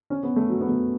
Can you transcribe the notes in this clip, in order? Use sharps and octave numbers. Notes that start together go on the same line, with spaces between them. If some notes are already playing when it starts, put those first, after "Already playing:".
C#4
B3
A3
F#3
B3
A3